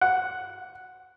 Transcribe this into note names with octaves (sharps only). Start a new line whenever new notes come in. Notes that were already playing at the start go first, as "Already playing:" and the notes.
F#5